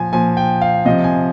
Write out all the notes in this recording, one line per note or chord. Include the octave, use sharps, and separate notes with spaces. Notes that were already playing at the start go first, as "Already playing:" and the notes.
Already playing: A#2 F3 G#5
A#2 F3 G#5
G5
F5
C3 F3 D#5
G#5